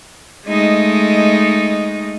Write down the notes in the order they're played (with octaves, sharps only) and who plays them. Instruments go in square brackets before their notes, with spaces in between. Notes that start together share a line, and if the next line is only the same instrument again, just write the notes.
[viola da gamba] G#3 A3 D#4